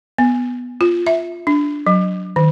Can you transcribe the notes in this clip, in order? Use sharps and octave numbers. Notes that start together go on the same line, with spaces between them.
B3
F4
E5
D4
F#3
D#3